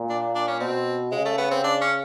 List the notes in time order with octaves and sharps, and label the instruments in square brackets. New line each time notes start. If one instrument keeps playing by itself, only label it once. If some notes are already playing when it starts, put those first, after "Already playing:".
Already playing: [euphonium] A#2
[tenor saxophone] D4
D4
C#4
[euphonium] B2 [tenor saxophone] C4
[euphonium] C#3 [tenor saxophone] G#3
[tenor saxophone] A3
B3
C4
D4
C#4